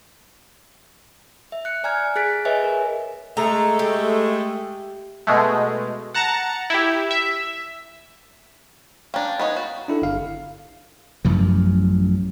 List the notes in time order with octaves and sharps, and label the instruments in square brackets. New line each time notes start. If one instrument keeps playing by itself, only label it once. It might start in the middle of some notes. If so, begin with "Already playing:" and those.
[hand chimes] E5
F#6 C#7
D5 G#5 A#5 F6 G#6
G#4 F#6 A6 B6 D7
G#4 B4 C#5 D#5 E5 G#5
A#4
[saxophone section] G#3 A3 [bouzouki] A#5
[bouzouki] G4
[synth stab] B2 G#3 A3
F#5 A5 A#5 A#6 C#7
E4 G4
E5
[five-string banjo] C#4 D4 [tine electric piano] F5 G5 A#5
[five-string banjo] B3 D#4 C#5
F#4
[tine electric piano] D4 E4 A4
G1 F5
[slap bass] A1 F#2 F3